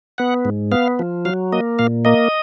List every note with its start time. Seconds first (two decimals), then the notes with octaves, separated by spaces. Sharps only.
0.18 B3 F#5
0.45 G#2
0.72 B3 F5
0.99 F3
1.25 F#3 F5
1.53 A#3 D#5
1.79 A#2 F5
2.05 A#3 D#5